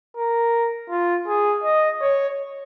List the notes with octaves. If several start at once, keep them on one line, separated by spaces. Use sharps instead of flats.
A#4
F4
G#4
D#5
C#5